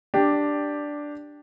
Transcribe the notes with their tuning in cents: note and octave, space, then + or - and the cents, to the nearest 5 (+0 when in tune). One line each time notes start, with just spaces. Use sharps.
D4 +0 G4 +5